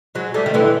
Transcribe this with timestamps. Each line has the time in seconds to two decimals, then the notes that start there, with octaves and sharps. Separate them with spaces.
0.15 F#3 G#3
0.34 G3 A3
0.46 D#3
0.54 D3 E3